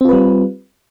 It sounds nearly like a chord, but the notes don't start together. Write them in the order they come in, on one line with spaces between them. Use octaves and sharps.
C4 F4 B4 G3